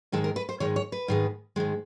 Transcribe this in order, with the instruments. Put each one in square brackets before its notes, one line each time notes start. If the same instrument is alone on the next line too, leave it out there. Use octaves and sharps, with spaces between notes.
[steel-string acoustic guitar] G#2 D#3 G#3 A4
A#4
B4
C5
G#2 D#3 G#3 C#5
C#5
B4
G#2 D#3 G#3
G#2 D#3 G#3